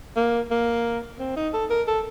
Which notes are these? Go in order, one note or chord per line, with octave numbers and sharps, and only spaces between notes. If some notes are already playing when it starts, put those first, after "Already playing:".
A#3
A#3
C4
D#4
A4
A#4
A4